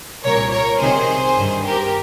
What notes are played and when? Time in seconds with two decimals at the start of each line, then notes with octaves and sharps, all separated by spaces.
0.23 C2 A#2 A#4 C#5
0.51 A#4 C#5
0.79 C2 C3 D#3 G#4 C5
1.36 G2 D#3
1.64 G4 A#4